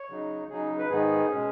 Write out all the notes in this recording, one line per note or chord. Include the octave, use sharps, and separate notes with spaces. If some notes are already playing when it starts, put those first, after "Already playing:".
Already playing: C#5
C#3 F#3 D#4
C#3 F#3 D#4 G#4
B4
G#2 D#3 B3 D#4 G#4
B2 G#3 C#4